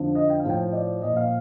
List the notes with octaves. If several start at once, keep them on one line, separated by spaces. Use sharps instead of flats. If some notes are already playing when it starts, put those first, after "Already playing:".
Already playing: F2 D3 F3
D#5
G5
F5
A2 F3 G5
D5
A#2 F3 D#5
F5